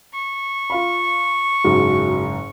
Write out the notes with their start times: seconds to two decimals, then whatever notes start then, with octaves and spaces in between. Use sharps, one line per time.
0.14 C#6
0.70 F4 F5 B5
1.65 F#1 G#2 F#4